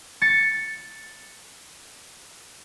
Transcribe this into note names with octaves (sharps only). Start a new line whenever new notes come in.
A6 C#7